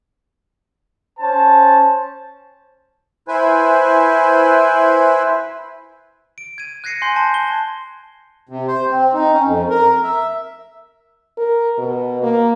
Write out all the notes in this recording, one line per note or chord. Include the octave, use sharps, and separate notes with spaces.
C#4 C5 A5
E4 B4 C5 G#5
D7
G#6 D#7
F#6 G#6 A#6 C7 C#7 D#7
G#5 C6 G6 C7
A5
G7
C3
C5
C4
D#4
C#4
F2
A#4
E5
A#4
B2
A#3